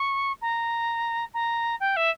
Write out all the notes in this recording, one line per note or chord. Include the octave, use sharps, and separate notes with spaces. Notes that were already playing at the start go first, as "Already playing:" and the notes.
Already playing: C#6
A#5
A#5
G5
E5